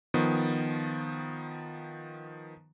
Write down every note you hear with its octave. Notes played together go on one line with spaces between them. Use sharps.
D#3 F3 B3